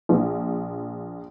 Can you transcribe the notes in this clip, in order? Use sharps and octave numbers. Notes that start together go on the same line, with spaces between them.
A#1